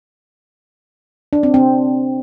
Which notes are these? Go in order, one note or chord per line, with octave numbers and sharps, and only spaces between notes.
D4
C4
C4